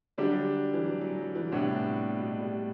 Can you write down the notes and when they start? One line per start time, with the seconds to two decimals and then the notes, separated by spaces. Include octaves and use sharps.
0.18 D3 F#3 G3 D4 G4
0.73 E3
0.85 F#3
1.01 F#3
1.18 F#3
1.35 E3
1.51 A2 C3 G3 B3 D4
2.19 B2
2.40 G3